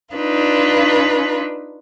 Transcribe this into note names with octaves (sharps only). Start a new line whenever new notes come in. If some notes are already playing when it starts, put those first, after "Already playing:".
D4 D#4 F4 B4